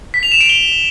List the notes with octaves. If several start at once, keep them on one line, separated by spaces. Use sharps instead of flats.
B6
F7
E7
D7
G7